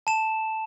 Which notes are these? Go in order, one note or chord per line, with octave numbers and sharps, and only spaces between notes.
A5 E7